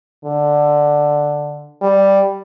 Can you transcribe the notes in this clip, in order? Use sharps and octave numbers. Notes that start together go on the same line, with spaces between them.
D3
G3